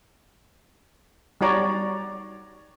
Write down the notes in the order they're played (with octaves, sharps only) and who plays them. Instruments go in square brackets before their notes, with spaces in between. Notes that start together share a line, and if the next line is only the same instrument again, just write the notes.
[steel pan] G3 D#4 F#4 C#5 D5 A#5